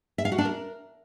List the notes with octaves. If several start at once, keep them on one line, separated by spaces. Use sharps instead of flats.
E5
F5
F#4
D4
A#4